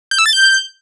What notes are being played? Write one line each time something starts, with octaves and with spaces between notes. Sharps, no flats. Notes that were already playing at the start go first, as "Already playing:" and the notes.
G6
E6
A6
G6